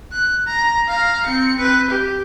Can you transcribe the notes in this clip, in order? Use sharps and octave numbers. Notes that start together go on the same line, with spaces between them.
F#6
A#5
F5 A#5
C4 C#7
C4 B4
G4